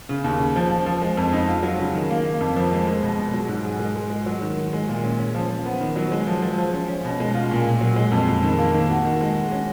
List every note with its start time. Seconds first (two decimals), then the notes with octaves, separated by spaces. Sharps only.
0.09 C#3
0.24 D#2
0.40 C#3
0.56 F3
0.71 F3
0.86 F3
1.02 G#3
1.17 F2
1.32 D#4
1.48 F4
1.63 F#3
1.79 C#3
1.95 D#3
2.10 A#3
2.25 A#3
2.41 F2
2.56 F3
2.71 G#3
2.87 G#3
3.03 B2
3.19 B2
3.34 F#3
3.48 G#2
3.65 G#4
3.79 G#3
3.96 G#3
4.10 G#3
4.26 F#3
4.42 D#3
4.57 D#3
4.73 G#3
4.88 A#2
5.04 C#4
5.19 C#4
5.35 F3
5.49 F3
5.65 B3
5.81 D#3
5.96 F#3
6.12 G#3
6.27 F3
6.42 F3
6.58 F3
6.73 C#4
6.88 C#4
7.05 B2
7.20 G#3
7.35 F4
7.51 A#2
7.67 A#2
7.81 F#3
7.96 G#3
8.12 F2
8.28 F2
8.43 D#3
8.59 A#3
8.74 D#3
8.90 F#4
9.05 D#3
9.21 G#3
9.36 F#4
9.52 C#4